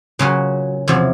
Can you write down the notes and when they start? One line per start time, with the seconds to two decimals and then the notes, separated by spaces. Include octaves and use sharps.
0.19 A#2 C#3 F#3 C#4
0.88 E2 C3 F3